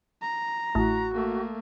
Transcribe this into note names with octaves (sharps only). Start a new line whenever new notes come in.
A#5
A1 F#4
A3 A#3